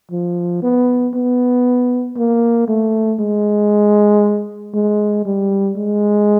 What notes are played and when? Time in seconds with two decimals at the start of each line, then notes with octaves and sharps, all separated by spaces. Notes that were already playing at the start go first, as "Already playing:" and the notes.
0.11 F3
0.63 B3
1.15 B3
2.17 A#3
2.68 A3
3.20 G#3
4.74 G#3
5.25 G3
5.77 G#3